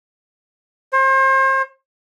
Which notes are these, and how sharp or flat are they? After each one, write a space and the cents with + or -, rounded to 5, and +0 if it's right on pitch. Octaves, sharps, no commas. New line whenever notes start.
C5 +35